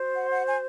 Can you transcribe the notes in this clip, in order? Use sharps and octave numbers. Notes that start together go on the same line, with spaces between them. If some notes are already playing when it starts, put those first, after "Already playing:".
Already playing: F#4 C5
F#5
F#5
G#5